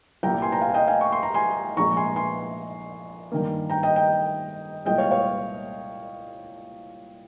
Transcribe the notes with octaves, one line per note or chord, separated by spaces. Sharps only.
C2 A#2 G3 G5 A#5
G#5 C6
G5 A#5
F5 G#5
D#5 G5
F5 G#5
C#6
C6
A#5
G#5 C6
A#1 A#2 G#3 A#5 C#6
G#5 C6
G#5 C6
G2 D#3 A#3
G5 A#5
D#5 G5
D#5 G5
C2 A#2 G#3 D#5 G5
C#5 F5
C#5 F5